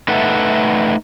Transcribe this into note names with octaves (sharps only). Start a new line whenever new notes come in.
A3 D#4 A4 B4 E5 F#5